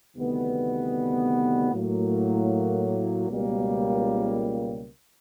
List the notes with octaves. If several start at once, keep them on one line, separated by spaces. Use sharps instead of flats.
D2 C3 D#3 G3 B3
A2 F#3 A#3
C#2 B2 G3 A#3